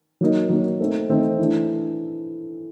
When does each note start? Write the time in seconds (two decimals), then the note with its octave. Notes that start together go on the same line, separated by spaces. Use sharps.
0.21 F#3 A#3 D#4
0.50 F#3 A#3 D#4
0.80 A3 C4 D#4
1.09 A3 C4 D#4
1.39 E3 A3 D4